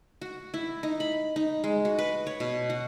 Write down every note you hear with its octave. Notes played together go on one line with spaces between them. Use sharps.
F#4
E4
D#4
B5
D#4
G#3
F#4
B4
C#5
B2
F#4